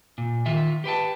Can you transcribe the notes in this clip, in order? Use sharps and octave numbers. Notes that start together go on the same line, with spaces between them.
A#2
D#3 F4 E5
G4 B4 G5 A5